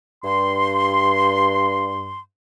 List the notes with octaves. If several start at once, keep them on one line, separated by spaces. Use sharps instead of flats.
G2 C6